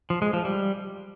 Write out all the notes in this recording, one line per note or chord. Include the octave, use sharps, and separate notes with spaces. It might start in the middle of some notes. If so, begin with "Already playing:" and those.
F3
G#3
F3
G3